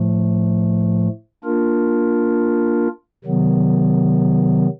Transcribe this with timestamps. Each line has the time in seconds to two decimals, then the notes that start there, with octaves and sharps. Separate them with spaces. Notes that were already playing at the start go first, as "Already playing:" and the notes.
Already playing: A2 F3 A3
1.44 A#3 D4 F4 A#4
3.24 C3 D#3 F#3 B3